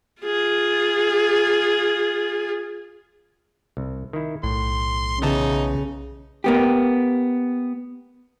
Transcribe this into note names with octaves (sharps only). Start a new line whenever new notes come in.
F4 G#4
C2
D#3 E4
B1 A2 C6
C#3 E3 B3 D#4 A5
A#3 B3 G4